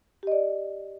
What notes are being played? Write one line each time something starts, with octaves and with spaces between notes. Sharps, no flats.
G4 D5 D#5